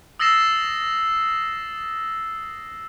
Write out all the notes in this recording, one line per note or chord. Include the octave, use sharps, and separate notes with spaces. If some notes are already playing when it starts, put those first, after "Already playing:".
D#6 E6 A6 A#6 C7 E7